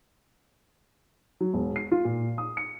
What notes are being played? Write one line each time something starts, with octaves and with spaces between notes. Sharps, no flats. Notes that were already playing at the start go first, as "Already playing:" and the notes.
F#3
E1
C7
F4
A#2
D#6
C#7